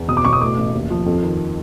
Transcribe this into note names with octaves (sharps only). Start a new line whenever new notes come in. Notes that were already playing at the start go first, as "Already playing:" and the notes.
Already playing: E2
B2 D#6
D6
B2 C#6
D#6
A2 D6
A1
D#2
F3
F2
D#3